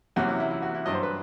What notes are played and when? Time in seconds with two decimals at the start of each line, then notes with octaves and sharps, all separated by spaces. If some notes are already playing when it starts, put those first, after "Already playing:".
0.16 E2 C3 F#3 F#4
0.28 E4
0.40 E4
0.51 E4
0.62 F#4
0.74 E4
0.86 G2 F#3 D#5
0.94 C5
1.03 B4